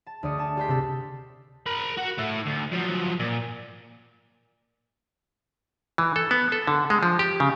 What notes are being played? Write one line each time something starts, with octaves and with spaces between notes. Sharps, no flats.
A5
D2 D5 D#6 C#7
G#5 A5
G4 D5 C6 G6 B6
C3 C4 A4
A#4 B5
F#4 F#5
A3 E4
D2
F3 F#3
A#2
E3
A4
B3
A4
D3
G#3
F3
G4
C#3